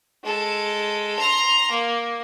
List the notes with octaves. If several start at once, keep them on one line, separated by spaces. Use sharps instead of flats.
G#3 A4
A#5 C6
A#3